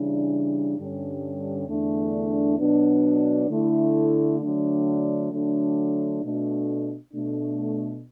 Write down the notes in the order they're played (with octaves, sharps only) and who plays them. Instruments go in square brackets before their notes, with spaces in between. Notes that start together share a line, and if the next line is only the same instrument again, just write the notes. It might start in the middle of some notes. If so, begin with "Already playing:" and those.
Already playing: [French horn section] C#3 E3 G3 D4
G2 D3 G3 C#4
E2 D3 A3 D4
B2 F#3 B3 D4
D3 A3 E4
D3 F#3 A3 D4
D3 F#3 A3 D4
B2 A3 D4
B2 A3 D4